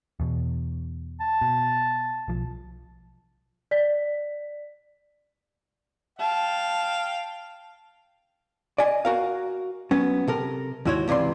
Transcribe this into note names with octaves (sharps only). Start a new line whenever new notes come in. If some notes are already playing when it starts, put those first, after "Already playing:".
E2 B2
A5
B2
B1 F3
D5 B6
F5 G5 A5
D5 D#5 G#5
F#4 A#4 F5
F#3 B3 C#4
C3 A4 A#4
D#2 G#2 E4 F#4 C5 C#5
C#2 C3 E3 D5 C6